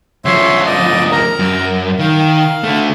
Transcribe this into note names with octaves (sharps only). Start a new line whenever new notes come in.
D2 F3 C#5 E5 C6
D5 D#5
A#4 A#5
F#2
D#3 F5
D3 A3